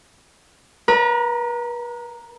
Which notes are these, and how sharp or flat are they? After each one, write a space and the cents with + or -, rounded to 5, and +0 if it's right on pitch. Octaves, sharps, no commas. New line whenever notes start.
B4 -40 A#5 +0